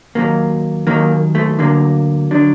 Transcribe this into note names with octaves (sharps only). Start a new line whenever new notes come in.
D#2 D#3 F#3 A#3
D#2 D#3 F#3 A#3
A3
D2 D3 F#3 A#3
D3 F#3 D4